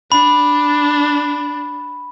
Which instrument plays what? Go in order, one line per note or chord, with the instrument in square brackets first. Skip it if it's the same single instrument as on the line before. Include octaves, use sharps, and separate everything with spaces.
[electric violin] D4 [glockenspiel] B5